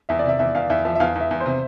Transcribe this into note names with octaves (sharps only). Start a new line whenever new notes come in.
E2 E5
D5
C3 E5
E2 E5
E2 F5
E2 E5
F3 E5
E5
E2 F5
E2
E5
E2
C5
C3